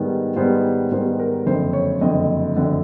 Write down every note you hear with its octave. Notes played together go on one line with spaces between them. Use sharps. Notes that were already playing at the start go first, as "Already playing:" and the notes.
Already playing: G#2 D#3 G3 B3
G#2 D#3 G3 B3 C5
G#2 D#3 G3 B3 C5
A#4
F#1 F2 D3 C5
C#5
F#1 F2 D3 D#5
F#1 F2 D3